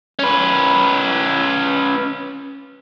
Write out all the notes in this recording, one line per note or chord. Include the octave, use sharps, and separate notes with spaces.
C#4 B4